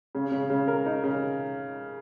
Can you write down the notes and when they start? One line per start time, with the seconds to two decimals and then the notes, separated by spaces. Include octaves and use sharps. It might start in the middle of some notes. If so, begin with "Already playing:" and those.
0.15 C#3
0.32 C#3
0.50 C#3
0.68 A#4
0.86 D#4
1.04 C#3